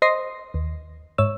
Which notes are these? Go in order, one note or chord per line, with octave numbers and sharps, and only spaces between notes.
C5 D#5 C6 D#6 A#6 C7
D#2
G#2 C#5 E6